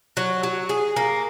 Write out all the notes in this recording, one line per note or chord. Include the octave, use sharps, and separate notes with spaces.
F#3
F#3
G#4
A#3